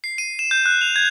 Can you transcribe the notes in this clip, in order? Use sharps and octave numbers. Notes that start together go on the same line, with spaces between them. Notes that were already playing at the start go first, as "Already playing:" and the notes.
C7
D#7
E7
G6
F#6
F7
G#6